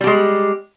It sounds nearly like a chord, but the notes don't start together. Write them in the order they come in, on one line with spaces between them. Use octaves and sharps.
G3 G4 G#3